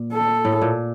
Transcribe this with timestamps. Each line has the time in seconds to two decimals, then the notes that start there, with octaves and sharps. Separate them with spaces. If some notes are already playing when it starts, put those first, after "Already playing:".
Already playing: A#2
0.13 A4
0.45 A2
0.62 A#2